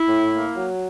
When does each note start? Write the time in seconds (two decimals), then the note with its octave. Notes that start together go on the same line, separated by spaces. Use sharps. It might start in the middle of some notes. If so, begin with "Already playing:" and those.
Already playing: E4
0.09 A2
0.32 A#3
0.55 F#3